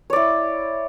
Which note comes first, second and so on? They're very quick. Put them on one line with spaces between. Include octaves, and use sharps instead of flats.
C#5 D5 E4